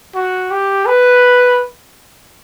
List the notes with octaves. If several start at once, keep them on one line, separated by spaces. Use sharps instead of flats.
F#4
G4
B4